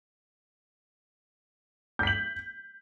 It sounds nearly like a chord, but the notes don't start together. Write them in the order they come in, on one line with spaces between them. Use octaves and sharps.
G6 B6 F#7